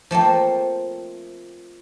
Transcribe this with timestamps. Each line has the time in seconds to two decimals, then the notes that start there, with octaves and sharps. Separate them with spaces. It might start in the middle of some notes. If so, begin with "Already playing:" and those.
0.11 F3 A3 A#3 C4